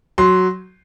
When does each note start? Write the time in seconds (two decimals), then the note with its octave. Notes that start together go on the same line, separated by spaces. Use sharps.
0.18 F#3 C6